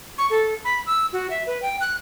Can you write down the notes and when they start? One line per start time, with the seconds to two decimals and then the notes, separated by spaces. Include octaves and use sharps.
0.18 C#6
0.30 A4
0.65 B5
0.86 E6
1.13 F#4
1.30 E5
1.47 B4
1.62 G5
1.81 F#6